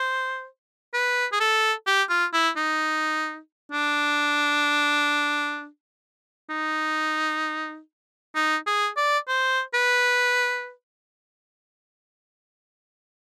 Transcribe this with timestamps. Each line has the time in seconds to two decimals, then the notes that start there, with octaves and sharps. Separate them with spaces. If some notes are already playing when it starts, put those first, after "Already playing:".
Already playing: C5
0.94 B4
1.32 G#4
1.40 A4
1.87 G4
2.09 F4
2.33 E4
2.57 D#4
3.72 D4
6.50 D#4
8.35 D#4
8.67 G#4
8.97 D5
9.28 C5
9.74 B4